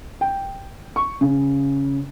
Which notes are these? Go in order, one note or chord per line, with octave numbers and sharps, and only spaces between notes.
G5
C#6
C#3